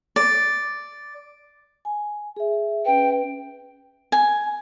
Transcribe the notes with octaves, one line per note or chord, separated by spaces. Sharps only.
D5
G#5
G#4 E5
C#4 B4 G5
G#5